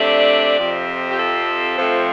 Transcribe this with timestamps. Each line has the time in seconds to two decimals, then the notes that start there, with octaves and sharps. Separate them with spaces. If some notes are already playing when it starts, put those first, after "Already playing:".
Already playing: C3 A3 D4 D5
0.58 F2 C3 F3 C4
1.11 G4
1.18 A4
1.78 F2 F3 A3 C4